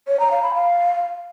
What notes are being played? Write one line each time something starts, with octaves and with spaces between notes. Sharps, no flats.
C#5
A#5
F5
B5
F5